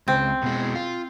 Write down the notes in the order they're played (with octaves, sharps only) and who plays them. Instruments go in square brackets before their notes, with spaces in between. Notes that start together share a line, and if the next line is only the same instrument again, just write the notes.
[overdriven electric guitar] C#2 [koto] C4
[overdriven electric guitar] B2 G#3
F4